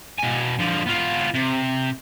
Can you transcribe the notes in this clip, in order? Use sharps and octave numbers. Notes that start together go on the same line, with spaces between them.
B2 G#5
D3 F3
B3 F4
C3